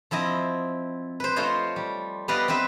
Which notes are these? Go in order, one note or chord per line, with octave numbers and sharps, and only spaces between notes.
F3 C4 E4 D#5
B4 C5
A3 F4 C5 C#5 D#5
G3
B3 G4 B4 D5 D#5 F5
C4 G4 B4 E5